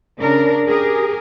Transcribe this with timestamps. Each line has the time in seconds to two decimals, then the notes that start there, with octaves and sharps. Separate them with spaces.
0.19 C#3 D4 A#4
0.67 G4 G#4 A#4